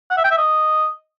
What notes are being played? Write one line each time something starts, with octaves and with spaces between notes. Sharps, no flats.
F#5
E5
G5
E5
D#5